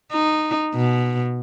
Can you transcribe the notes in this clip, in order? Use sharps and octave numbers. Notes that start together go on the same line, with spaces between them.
D#4
B2